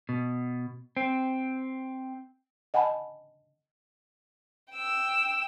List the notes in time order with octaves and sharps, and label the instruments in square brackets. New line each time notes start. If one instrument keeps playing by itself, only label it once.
[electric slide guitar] B2
C4
[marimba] D#5 F#5 G#5 A5 B5
[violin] G5 E6